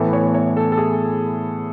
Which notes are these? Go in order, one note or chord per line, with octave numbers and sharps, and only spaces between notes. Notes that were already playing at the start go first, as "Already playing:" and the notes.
Already playing: A2 E3 B3 A4
C#5
C#5
A4
A4
G#4